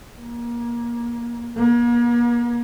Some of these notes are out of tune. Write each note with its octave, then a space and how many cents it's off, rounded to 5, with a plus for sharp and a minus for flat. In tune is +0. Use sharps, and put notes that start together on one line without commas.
A#3 +25
A#3 +40